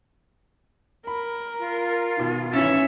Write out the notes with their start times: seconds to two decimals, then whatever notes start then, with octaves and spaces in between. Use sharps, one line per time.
1.07 A#4 B5
1.59 F4
2.17 B2 D#3
2.53 G#1 E3 C#4 E5 A6